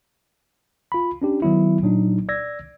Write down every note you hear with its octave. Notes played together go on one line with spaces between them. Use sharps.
F4 B5
C#4 D4 G4
D#3 F#3 B3 E4
A#2 F#3 D4 D#4
D5 E6 G#6 A#6